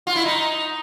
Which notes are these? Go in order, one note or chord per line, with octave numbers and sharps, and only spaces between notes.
F4
E4
D#4